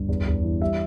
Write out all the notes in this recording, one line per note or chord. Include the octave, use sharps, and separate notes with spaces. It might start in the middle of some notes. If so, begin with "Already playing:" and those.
Already playing: G1
E2
E2
E3
G3 E5